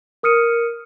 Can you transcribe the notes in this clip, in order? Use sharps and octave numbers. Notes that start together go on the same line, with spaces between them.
A#4 D#6 F6 C#7 D#7